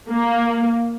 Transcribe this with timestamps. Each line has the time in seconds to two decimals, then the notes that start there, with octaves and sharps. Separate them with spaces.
0.11 A#3